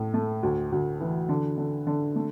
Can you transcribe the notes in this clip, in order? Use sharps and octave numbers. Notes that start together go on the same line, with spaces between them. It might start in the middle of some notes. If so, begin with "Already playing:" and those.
Already playing: A2
A3
D2
D2
E3
D3
D3
D3
A3